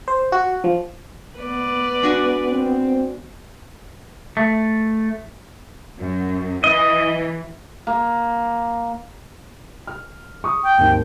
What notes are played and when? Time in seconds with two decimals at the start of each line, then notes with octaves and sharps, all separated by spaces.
0.08 C5
0.32 F#4
0.64 F3
1.38 B3 B4 D5
2.02 G#3 D4 F#4
2.51 C4
4.37 A3
5.99 F#2
6.64 E3 D#5
7.87 A#3
9.87 F6
10.44 C#6 D#6
10.64 G5
10.78 G#1 D#2